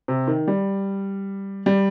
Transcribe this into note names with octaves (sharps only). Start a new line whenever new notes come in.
C3
D#3
G3
G3